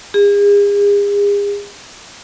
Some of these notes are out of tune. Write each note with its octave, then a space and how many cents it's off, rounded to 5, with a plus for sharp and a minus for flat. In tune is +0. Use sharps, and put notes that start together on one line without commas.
G#4 -40